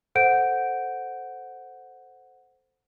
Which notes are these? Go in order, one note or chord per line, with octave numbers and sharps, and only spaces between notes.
A4 C5 F#5 G6 D7